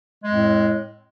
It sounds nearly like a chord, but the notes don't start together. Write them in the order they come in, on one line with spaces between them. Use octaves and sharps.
G#3 F2 A2